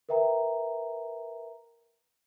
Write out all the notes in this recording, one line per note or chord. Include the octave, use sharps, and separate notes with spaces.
A#4 B4 E5 G5 A#5